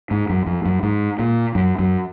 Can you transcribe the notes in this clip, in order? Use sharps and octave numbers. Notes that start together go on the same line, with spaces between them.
G#2
F#2
F2
F#2
G#2
A#2
F#2
F#2